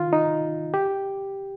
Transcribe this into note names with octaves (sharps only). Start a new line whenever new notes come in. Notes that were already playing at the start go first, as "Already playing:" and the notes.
Already playing: D#3 F4
D#4
G4